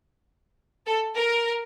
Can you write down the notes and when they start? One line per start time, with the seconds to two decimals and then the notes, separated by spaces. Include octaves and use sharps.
0.86 A4
1.16 A#4